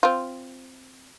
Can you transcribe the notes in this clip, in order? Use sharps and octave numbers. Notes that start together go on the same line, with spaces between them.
C4 F4